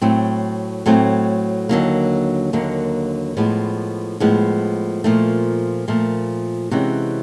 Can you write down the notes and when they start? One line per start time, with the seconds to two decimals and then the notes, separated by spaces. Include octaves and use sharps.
0.01 A2 F#3 A3 C4
0.86 A2 F#3 A3 C4
1.69 D#2 D3 F#3 A#3
2.53 D#2 D3 F#3 A#3
3.37 A2 F3 G#3 B3
4.20 A2 F3 G#3 B3
5.04 A#2 F3 A3
5.88 A#2 F3 A3
6.71 C3 E3 G#3 C#4 F#4